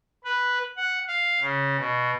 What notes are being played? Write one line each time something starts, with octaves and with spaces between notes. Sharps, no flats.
B4
F#5
F5
C#3
B2